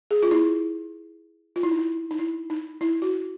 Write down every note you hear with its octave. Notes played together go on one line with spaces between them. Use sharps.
G#4
F4
E4
F4
E4
D#4
E4
D#4
E4
D#4
E4
F#4